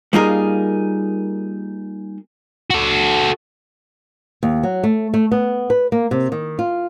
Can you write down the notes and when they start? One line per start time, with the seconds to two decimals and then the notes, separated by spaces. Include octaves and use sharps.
0.13 G3 A#3 D#4 F4 G#4 A#4
2.70 F#4 A4
4.43 D#2
4.63 F#3
4.83 A3
5.14 A3
5.32 B3
5.70 B4
5.92 A#3
6.11 C3
6.32 D#3
6.59 F4